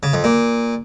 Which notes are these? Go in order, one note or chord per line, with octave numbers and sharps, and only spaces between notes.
C#3
F2
A#2